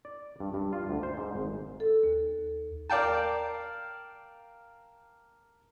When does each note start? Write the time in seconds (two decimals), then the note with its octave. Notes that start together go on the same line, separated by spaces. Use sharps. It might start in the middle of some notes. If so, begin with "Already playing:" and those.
0.05 D5
0.40 G2
0.54 G2
0.73 F4
0.89 D2
1.03 C5
1.17 G#2
1.35 G#1
1.80 A4
2.04 D#2
2.90 A#4 D5 F5 G5 A5